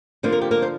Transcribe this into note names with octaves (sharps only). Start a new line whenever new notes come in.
D3 F3 A#3 D4 C5
A#4
G4
A#3 A#4
C5